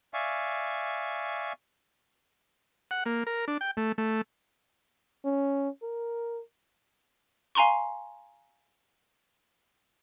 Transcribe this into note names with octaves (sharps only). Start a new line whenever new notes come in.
D5 E5 F5 G#5 C#6
F#5
A#3
A#4
D4
G5
A3
A3
C#4
A#4
F5 G#5 A#5 C6 C#6